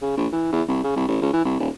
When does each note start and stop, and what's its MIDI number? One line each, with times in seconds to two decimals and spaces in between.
0.02 0.14 49
0.17 0.27 34
0.32 0.51 52
0.53 0.62 40
0.68 0.80 36
0.84 0.95 49
0.96 1.07 36
1.08 1.18 33
1.22 1.31 37
1.34 1.45 52
1.45 1.59 36
1.60 1.69 27